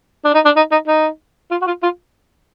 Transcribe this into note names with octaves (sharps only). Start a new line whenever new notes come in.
D4
D#4
D4
D#4
D#4
D#4
F4
F#4
F4
F4